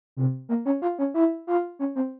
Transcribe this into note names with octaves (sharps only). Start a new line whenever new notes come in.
C3
A#3
C#4
F4
C#4
E4
F4
C#4
C4